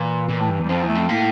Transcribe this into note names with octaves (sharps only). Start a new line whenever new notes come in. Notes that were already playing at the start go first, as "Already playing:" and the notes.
Already playing: A#2 E3
A#2
A2
G2
E2
G3
F2 F3
E2
A3
F2
A2 A#3